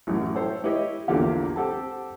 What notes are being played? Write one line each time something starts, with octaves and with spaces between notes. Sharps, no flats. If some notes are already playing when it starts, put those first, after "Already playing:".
A1 F#2 F#4
E4 A4 C5 C#5 G5
E4 G4 B4 C#5 D#5
A#1 E2 A#2 D3 G4 F5
C4 G4 A4 F#5 A5